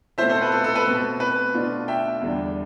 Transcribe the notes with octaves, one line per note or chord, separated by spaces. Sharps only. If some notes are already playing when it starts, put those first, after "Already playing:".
B2 A3 C4 F4 C5 E5
A4 C5
B4
A4
A4
B4
B2 A3 C4
B4
B2 A3 D4 F4
E5 G5
E2 D3 G3 D4